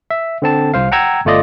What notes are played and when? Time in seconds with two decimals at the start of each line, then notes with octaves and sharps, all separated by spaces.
0.11 E5
0.42 D3 C4 A5
0.74 C2 C5 F5
0.92 F#5 G5 A#5 E6 G#6
1.25 G1 A3 F4 D5 D#5